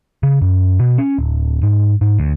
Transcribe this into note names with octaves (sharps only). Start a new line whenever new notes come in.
C#3
F#2
B2
C#4
D1
G#2
G#2
D2